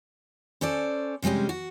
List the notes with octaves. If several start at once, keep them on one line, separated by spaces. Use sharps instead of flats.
C#4 A4 C5 D5
C3 G3 G#3 C#4 G4
F#4